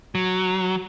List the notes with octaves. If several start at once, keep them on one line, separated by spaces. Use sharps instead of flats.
F#3